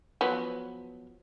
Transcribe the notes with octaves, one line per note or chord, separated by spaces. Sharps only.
F3 F#3 B3